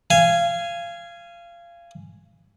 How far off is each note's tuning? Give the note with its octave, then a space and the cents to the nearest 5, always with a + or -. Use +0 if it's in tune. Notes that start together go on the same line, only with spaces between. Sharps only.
F5 -25 G#5 +0